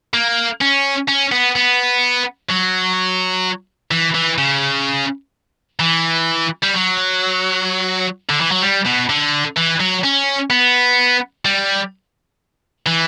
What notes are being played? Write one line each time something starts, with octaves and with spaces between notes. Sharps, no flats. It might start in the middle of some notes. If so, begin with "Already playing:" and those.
A#3
C#4
C#4
B3
B3
F#3
E3
E3
C#3
E3
G3
F#3
D3
E3
F#3
G3
B2
D3
E3
F#3
C#4
B3
G3
E3